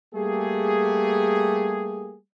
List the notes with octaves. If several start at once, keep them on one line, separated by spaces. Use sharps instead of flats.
G3 A3 A#3 G4 G#4